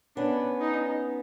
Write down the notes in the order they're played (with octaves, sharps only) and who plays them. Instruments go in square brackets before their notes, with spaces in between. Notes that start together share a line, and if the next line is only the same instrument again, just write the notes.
[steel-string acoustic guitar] B3 C#4 [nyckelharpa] D4
[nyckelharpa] D#4